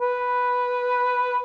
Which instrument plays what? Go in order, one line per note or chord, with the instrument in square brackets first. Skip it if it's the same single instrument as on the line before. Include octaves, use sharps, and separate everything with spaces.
[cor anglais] B4